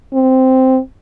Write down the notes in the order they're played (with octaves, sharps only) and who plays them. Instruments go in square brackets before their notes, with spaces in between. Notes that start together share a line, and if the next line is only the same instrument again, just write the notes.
[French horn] C4